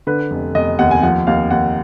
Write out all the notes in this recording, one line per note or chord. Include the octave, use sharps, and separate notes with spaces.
D3 B4
F1
F1 D#5
D#2 F#5
G#5
F3 F#5
D#2 F5
D#2 F#5